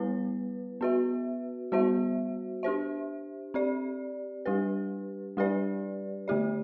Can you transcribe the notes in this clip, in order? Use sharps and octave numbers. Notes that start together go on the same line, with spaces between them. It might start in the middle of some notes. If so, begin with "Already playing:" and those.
Already playing: G3 B3 E4 B4
B3 F#4 B4 E5
G3 B3 F#4 C5 E5
D4 G4 C5 E5
C4 G4 D5
G3 D4 G4 B4
G3 D4 G4 B4 D5
D3 A3 E4 G4 D5